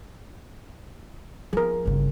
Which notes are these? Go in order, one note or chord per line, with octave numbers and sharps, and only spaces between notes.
F3 B3 G#4 A#4
G1 C#3